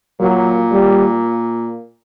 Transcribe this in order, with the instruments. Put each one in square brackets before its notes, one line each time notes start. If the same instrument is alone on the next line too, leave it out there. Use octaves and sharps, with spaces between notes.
[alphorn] A#2 [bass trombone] F#3
[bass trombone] G3